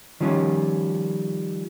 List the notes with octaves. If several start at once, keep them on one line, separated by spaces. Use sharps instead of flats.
D#3 F3 G3 C#4